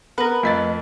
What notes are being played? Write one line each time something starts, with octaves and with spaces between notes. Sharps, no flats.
B3 A#4 B4
F2 A3 D#5 A6